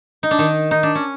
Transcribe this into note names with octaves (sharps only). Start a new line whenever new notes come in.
D#4
D4
D#3 D#4
D#4
D4
C#4